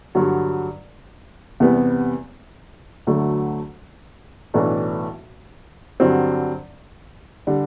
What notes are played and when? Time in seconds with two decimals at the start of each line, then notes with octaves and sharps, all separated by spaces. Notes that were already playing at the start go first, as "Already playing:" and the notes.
0.15 G2 D3 F#3
1.60 E2 C3 G3 B3
3.07 D2 D3 F#3 A3
4.54 B1 A2 E3 A3 D4
6.00 G2 D3 F#3 C4
7.47 D3 G3